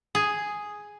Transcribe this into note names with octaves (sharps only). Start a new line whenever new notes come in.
G#4